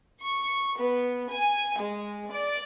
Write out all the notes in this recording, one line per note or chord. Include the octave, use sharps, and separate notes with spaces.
C#6
B3
G#5
G#3
D5